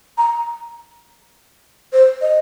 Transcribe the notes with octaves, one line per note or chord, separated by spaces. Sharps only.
A#5
C5
D#5